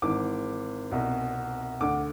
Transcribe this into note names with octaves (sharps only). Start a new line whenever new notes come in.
G#1 G#2 E3 D6
C2 B2
D2 D3 D6